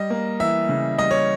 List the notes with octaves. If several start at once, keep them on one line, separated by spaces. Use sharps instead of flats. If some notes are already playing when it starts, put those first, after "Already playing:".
Already playing: G3 D#5
A#3
E3 E5
C#3
G3 D#5
C#5